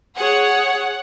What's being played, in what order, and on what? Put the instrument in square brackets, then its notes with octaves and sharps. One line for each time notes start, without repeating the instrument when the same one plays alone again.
[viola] G#4 C#5 [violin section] F#5